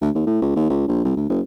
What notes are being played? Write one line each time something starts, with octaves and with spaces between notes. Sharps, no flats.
D2
D#2
A2
C#2
D#2
C#2
A#1
C2
D2
F#1